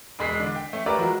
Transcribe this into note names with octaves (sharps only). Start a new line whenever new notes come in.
E1 G#3 B6 C7
D3 D4
G5
A3 C#4
G4 A#4 B4 C#5 D5 E5
F3 F#3 G#3 F#4 A#4